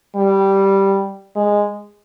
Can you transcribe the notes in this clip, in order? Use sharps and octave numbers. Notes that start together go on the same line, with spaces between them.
G3
G#3